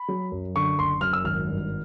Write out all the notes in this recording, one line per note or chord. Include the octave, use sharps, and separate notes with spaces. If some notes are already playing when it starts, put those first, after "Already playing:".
Already playing: B5
F#3
F#2
D3 C#6
F#1 C6
F#2 F6
E6
G#1 F6
G2